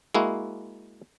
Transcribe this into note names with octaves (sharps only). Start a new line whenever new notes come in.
G#3 A#3 E4 F#4